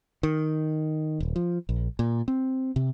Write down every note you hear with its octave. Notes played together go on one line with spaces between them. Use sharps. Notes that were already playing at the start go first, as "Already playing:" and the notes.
D#3
D#1
F3
A#1
A#2
C4
C3